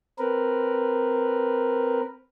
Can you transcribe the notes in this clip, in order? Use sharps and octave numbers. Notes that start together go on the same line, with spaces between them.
C4 A#4 B4